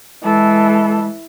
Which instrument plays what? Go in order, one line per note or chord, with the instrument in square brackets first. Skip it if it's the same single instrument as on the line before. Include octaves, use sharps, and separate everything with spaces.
[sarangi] E3 [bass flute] G#3 [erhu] A4